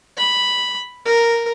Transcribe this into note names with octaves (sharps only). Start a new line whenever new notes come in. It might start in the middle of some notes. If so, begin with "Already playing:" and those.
B5
A#4